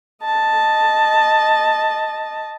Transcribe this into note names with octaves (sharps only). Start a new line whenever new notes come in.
D#5 A5